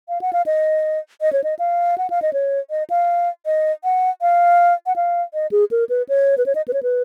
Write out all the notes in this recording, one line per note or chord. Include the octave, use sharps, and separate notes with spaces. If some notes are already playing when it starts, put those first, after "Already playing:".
F5
F#5
F5
D#5
D#5
C#5
D#5
F5
F#5
F5
D#5
C#5
D#5
F5
D#5
F#5
F5
F#5
F5
D#5
G#4
A#4
B4
C#5
B4
C#5
D#5
B4
C#5
B4